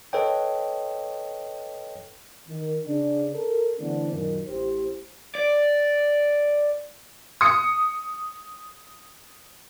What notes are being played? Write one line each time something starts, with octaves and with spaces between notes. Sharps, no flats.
A4 B4 C#5 D#5 G5
D#3
C#3 D4
A4 A#4
D3 E3 A3 B3 C4 D4
F#2 A#2 D#3
A1 G4 C5
D5
D#6 C#7